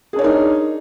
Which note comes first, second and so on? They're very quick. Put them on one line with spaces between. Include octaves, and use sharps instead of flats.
G#4 D4 C#5 A#4 D#4